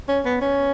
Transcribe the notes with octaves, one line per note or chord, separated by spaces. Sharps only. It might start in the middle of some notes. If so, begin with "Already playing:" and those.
C#4
B3
C#4